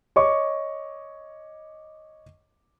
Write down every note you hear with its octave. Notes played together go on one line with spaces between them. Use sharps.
C#5 D#5 C#6 D6